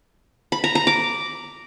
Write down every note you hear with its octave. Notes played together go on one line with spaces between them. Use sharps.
B5
A#5
A#5
D6